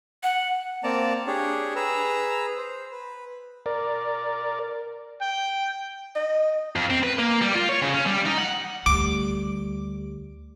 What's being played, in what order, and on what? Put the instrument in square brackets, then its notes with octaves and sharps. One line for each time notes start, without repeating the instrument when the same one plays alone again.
[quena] F#5
[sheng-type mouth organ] A#3 C4 D5 A5 A#5
D4 G4 G#4 C#5
G#4 B4 A#5 E6
C5
B4
[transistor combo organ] A#4 D5
[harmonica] G5
[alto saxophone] D#5
[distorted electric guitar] F2
C4
B4
A#3
G3
F4
C#5
C#3
C#4
G3
D#4
F#5
[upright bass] D2 [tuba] G3 [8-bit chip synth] D6